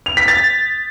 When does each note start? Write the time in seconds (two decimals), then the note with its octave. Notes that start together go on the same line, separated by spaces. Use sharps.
0.06 F7
0.17 B6
0.28 A6